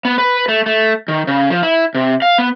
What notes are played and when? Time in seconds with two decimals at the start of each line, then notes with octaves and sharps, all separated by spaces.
0.05 B3
0.18 B4
0.48 A3
0.66 A3
1.08 D#3
1.27 C#3
1.50 F3
1.63 E4
1.95 C3
2.22 F5
2.38 B3